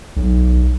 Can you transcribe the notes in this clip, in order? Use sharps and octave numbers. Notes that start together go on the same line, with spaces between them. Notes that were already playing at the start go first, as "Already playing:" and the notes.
B1